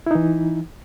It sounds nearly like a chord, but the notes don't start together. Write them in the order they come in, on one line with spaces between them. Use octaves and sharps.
E4 D#4 E3